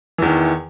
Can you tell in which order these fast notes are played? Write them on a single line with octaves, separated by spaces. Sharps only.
E3 E2 D#3